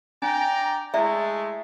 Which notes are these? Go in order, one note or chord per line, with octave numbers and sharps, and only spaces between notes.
D4 D5 G5 A#5
G#3 A3 E4 D5 E5